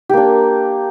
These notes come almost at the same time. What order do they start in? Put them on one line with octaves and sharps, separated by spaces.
G4 A#3 D4